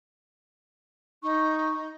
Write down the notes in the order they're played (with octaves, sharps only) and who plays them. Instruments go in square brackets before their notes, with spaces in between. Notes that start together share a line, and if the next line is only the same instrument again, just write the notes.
[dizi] D#4 [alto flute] C#6